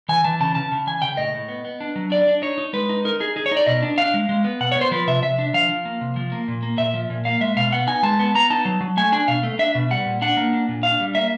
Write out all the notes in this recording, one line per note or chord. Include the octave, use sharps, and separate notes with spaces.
E3 G#5
E3 A5
C#3 A5
C#3 A5
C#3
E3 G#5
C#3 G5
A2 D#5
A2
B3
B3
D4
F#3
D4 D5
D4
D#4 C#5
D#4
G#3 B4
D#4
D#4 A#4
D#4 G#4
D#4 G#4
C#5
D#4
D5
B2 D#5
D4
D4 F5
G#3
G#3
B3
B2 F#5
C#5
B3
C5
F3 B4
C3 E5
C3 E5
D4
F3 F5
F3
A#3
C3
F3
A#3
A#2
A#3
A#2 E5
F3
A#2
A#3 F5
G#3 E5
B2 F5
B3 F#5
D#4 G#5
G#3 A5
B3
B3 A#5
D#4 A5
F#3
F#3
A3 G#5
D4 G#5
B2 F5
A3
D4 E5
B2
G3 F#5
A#2
D4 F#5
A#3
D4
A#2
D4 F5
G3
A#3 E5